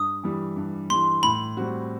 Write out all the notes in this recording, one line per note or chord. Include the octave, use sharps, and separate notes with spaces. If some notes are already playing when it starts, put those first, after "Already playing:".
Already playing: G2 D#6
E3 G3
G2
E3 G3 C6
A2 B5
G3 C4 F#4